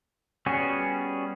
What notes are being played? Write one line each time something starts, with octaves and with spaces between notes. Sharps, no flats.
G3 B3 C#4 F#4 G#4